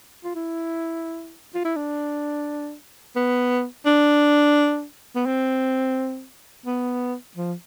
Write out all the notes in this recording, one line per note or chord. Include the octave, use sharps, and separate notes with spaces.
F4
E4
F4
E4
D4
B3
D4
B3
C4
B3
F3